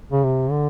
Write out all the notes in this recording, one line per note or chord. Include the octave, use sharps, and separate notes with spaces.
C#3
C3
D3